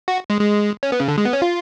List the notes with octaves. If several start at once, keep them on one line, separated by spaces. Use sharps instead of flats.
F#4
G#3
G#3
C#4
B3
C#3
D3
G#3
B3
C#4
F4